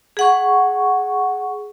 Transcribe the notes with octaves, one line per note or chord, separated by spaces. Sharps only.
G#4 F#5 C#6